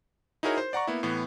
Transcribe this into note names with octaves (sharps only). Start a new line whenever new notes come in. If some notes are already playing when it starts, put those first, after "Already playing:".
D#4 E4 F#4 G#4 A#4 C#5
C5
D5 F#5 A#5 C#6
A#3 B3 E4
A2 E3 B3